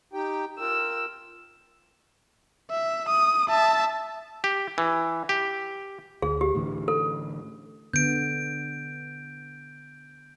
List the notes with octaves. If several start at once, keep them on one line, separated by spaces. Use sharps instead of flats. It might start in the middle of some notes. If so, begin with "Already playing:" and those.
D#4 G4 G5
F4 A#4 G5 E6
E5
D#6
E5 A5
G4
E3
G4
D2 G#4
G4
A2 D3 E3
A4
D3 B3 G6 D7